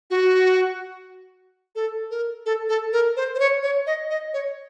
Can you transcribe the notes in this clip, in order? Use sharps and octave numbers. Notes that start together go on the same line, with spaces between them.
F#4
A4
A#4
A4
A4
A#4
C5
C5
C#5
C#5
D#5
D#5
C#5